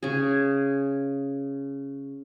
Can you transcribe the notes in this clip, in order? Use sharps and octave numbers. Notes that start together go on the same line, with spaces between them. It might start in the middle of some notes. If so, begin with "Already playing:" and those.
C#3 G#4